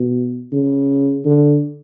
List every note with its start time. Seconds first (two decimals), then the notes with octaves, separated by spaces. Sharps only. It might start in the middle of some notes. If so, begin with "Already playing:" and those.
Already playing: B2
0.53 C#3
1.25 D3